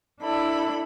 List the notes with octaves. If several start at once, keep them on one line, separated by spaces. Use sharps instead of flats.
D4 E4 A4 B5